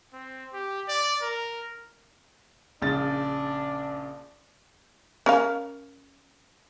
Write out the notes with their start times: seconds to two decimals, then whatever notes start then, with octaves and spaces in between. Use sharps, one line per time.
0.13 C4
0.54 G4
0.88 D5
1.22 A#4
2.82 A#1 C#3 D4 A6
5.26 C#4 A#4 F5